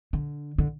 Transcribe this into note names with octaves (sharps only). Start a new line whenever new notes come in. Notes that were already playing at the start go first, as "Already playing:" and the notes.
D3
D3